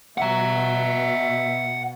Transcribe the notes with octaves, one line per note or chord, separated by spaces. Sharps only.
B2 E5 F#5 A#5